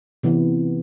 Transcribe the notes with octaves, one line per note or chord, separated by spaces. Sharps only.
C3 E3 B3